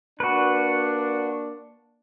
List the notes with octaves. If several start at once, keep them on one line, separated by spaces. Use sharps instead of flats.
A#3 D4 F#4 B4